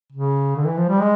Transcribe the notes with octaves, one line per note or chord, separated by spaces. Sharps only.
C#3
D3
E3
F3
G3
G#3